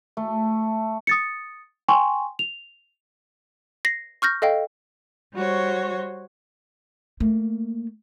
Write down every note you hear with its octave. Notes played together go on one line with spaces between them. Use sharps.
A3
D#6 A6 C#7
G5 G#5 C6 C#6
F7
A#6 C7
C#6 F6 G6 A#6
A4 D#5 F5 G5
G3 F#4 C5 C#5
A3 A#3